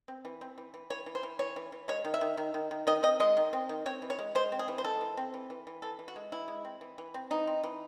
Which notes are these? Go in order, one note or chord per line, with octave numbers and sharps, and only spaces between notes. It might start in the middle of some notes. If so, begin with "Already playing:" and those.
C4
E3
C4
E3
E3
E3 C#5
E3
C5
E3
E3 C#5
E3
E3
G#3 C#5
D#3
E5
D#3
D#3
D#3
D#3
D#3 D#5
C4 D#5
G#3 D#5
D#3
C4
D#3
C4 C#5
E3
C#5
G#3
G#3 C5
C4
G#4
E3
C5
G#3 A4
E3
C4
E3
E3
E3
E3 A4
E3
F#4
G#3
E3 E4
G#3
C4
E3
E3
C4
E3 D#4
C4
E3